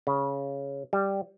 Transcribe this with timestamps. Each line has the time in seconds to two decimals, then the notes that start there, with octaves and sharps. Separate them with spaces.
0.07 C#3
0.93 G3